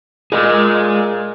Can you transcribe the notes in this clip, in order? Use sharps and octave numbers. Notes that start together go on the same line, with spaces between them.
A#2 G#4 D#5